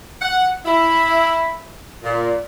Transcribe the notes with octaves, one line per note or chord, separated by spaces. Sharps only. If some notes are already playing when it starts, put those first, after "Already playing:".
F#5
E4
A#2